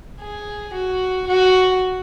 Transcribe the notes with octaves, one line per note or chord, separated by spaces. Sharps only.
G#4
F#4
F#4